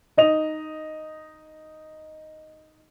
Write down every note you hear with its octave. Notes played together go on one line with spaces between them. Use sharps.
D#4 D#5 F7